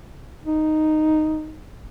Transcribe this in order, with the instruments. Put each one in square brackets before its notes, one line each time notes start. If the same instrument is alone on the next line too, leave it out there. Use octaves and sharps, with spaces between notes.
[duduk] D#4